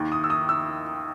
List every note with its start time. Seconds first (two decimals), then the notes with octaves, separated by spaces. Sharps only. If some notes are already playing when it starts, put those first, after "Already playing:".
Already playing: D#2 D#3
0.12 D#6
0.24 E6
0.30 D#6
0.49 E6